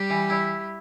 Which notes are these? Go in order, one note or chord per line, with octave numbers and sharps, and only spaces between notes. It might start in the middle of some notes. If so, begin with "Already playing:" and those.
Already playing: G3 G4
E3
E4